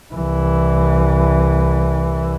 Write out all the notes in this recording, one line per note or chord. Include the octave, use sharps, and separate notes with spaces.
C2 E3